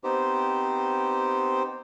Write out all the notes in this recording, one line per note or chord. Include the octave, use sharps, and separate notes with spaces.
B3 C4 D#4 G4 C5